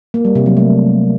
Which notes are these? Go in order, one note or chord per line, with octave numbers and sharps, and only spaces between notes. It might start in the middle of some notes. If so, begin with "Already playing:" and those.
A#3
G3
C3
F#3
A3